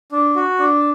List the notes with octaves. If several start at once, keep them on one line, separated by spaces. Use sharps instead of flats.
D4
F#4
D4